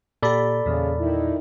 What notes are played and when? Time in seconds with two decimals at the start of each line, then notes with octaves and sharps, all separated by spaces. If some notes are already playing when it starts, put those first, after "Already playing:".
0.23 A#2 G4 A4 D5 B5
0.66 E2 A#2 C#3
1.00 D#3 D#4 E4